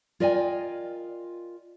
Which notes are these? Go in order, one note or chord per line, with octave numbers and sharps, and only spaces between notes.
F4 A#4 D5 D#5 G5 G#5